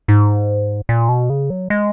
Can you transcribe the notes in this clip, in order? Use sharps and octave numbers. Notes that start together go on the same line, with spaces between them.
G#2
A#2
B2
C#3
F#3
G#3